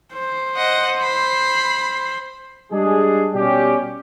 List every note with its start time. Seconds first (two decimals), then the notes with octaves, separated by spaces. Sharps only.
0.14 C5
0.56 D#5 F#5
1.02 B5 C7
2.72 G3 G#3 D4 G#4
3.33 B2 G3 C#4 G4